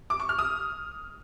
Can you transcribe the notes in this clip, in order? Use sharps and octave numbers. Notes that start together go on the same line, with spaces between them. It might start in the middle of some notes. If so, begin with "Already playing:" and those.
D6
C#6
F6
D#6